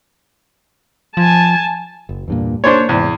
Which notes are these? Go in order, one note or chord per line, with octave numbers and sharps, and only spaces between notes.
F3 G#5 A5
F#1
E2 G2 A#2
A#3 D4 C5 C#5
E2 G#2 C3